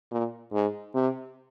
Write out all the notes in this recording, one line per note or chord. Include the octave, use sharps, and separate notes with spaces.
A#2
G#2
C3